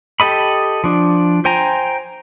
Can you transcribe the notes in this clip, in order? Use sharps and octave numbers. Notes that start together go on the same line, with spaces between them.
G4 A4 D#5 B5
F3 D4
C5 G5 G#5 A#5